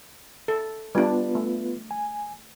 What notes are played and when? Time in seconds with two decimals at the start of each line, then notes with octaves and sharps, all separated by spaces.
0.48 A4
0.95 G3 B3 D4 F4 B4
1.35 A3
1.91 G#5